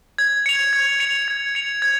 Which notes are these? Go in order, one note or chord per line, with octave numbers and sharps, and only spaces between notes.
G#6
C#7 F7
G#6
C#7 F7
G#6
C#7 F7
G#6